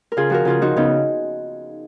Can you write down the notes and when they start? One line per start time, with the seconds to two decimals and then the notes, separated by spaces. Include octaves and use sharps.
0.12 A#4
0.17 C#3 F4 G#4
0.30 F3 F#4 A#4
0.45 C#3 F4 G#4
0.62 F3 D#4 F#4
0.77 C#3 B3 D#4